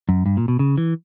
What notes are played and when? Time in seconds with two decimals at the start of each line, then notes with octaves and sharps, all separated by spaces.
0.09 F#2
0.26 G2
0.37 A#2
0.48 B2
0.59 C#3
0.78 E3